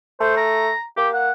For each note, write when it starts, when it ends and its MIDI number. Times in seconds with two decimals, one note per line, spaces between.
0.21 0.70 57
0.21 0.37 72
0.37 0.81 82
0.97 1.31 58
0.97 1.09 67
1.14 1.32 78